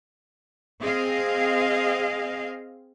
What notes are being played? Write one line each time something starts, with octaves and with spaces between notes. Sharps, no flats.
C4 G#4 D#5 F5